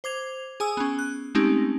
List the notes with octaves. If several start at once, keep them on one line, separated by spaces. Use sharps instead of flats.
C5 D6 G#6 F7
G#4 G#5 D#6 E6
B3 C#4
F#6
G#3 A3 C4 C#4 D#4 G4